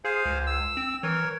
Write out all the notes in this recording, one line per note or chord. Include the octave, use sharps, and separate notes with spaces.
G#4 C5 F5 G#5
C#2
E6
C4
E3 A#4 C#5